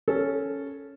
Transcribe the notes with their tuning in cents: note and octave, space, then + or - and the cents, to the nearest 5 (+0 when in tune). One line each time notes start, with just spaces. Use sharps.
C#4 +0 A4 -10